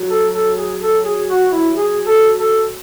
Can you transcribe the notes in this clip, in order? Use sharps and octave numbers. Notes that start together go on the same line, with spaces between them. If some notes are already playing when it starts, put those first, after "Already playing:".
Already playing: F#3
A4
A4
G#4
A4
G#4
F#4
E4
G#4
A4
A4